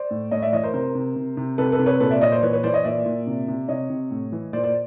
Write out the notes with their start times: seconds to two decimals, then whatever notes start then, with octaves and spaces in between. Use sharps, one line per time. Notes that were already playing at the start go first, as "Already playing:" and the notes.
Already playing: C5 D5
0.11 A2
0.31 A2 C#5 D#5
0.42 D5 E5
0.53 E3 C#5 D#5
0.63 A#4 C5
0.74 C3 A#4 C5
0.95 C3
1.16 C3
1.37 C3
1.58 C3 A4 B4
1.72 A4 B4
1.79 C3
1.86 B4 C#5
2.00 A#2 A4 B4
2.11 D5 E5
2.21 A#2 C#5 D#5
2.32 C5 D5
2.43 E3 B4 C#5
2.53 B4 C#5
2.63 E3 C5 D5
2.74 C#5 D#5
2.84 A#2 D5 E5
3.06 A#2
3.27 C3
3.48 C3
3.68 C3 C#5 D#5
3.90 C3
4.11 A2
4.32 E3
4.53 A#2 C5 D5
4.64 C5 D5